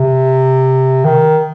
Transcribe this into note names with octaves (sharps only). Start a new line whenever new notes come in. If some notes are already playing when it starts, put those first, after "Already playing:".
Already playing: C3
D#3